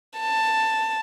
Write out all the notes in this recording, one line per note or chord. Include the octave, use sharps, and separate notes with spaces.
A5